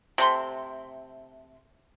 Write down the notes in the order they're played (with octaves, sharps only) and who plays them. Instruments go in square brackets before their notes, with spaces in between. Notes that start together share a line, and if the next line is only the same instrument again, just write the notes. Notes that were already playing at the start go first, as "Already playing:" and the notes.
[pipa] C3 A3 C6